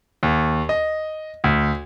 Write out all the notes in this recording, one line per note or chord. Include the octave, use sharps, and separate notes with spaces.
D#2
D#5
D2